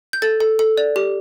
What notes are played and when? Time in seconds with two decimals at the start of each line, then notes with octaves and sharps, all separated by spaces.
0.13 G6
0.22 A4 A6
0.40 A4
0.59 A4
0.77 D5
0.96 G4